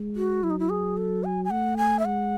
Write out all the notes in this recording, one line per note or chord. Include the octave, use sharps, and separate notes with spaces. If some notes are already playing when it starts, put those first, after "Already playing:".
Already playing: G#3
F#4
F#3 E4
D#4
E4
G#4
A4
G#5
G#5
A3 F#5
G#5
E5
G#3 F#5